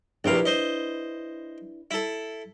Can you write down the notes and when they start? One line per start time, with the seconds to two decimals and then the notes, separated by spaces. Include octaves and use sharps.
0.24 A#1 C3 D4 E4 B4 F5
0.45 C5 D#5
1.91 E4 A4